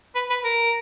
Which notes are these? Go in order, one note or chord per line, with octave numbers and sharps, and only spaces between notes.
B4
B4
A#4